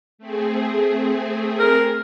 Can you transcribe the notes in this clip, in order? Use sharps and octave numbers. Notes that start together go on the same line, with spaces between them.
A3 C4 G#4
A#4